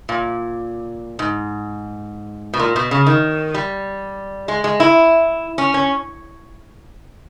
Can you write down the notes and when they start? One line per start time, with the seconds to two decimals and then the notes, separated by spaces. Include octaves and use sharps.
0.09 A#2
1.19 G#2
2.54 B2
2.59 A#2
2.76 B2
2.91 C#3
3.07 D#3
3.54 G3
4.48 G#3
4.64 G#3
4.80 E4
5.58 C#4
5.74 C#4